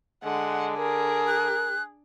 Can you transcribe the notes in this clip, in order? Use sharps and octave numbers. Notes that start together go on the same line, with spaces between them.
D3 G#3 F#5
G#4 A#4
F#6